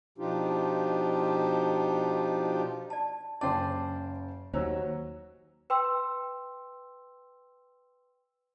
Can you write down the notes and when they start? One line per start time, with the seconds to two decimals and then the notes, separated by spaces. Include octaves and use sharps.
0.18 B2 F3 D4 D#4 F4 G4
2.90 D5 A5
3.41 F#1 C#4 D4 C5 D5 G5 A5
4.54 D#2 F#3 C#4 C5 C#5 A#5 E6
5.70 B4 G5 C6 E6